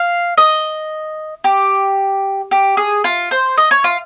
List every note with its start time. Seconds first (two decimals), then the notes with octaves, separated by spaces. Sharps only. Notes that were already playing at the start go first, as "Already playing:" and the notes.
Already playing: F5
0.37 D#5
1.44 G4
2.51 G4
2.77 G#4
3.04 F4
3.31 C5
3.57 D#5
3.71 C#5
3.84 F4